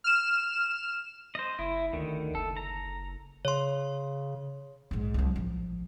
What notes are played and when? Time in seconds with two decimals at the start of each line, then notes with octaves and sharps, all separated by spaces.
0.04 F6 E7
1.35 C5 D#5
1.59 F#1 E4
1.93 D2 D3 D#3
2.35 F#1 A4
2.57 A#5
3.45 C#3 C#5 C6
4.91 A#1 G#2
5.14 C2 F#3
5.36 A1 F3